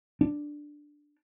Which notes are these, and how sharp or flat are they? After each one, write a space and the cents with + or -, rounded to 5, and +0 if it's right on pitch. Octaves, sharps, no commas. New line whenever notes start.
D4 +5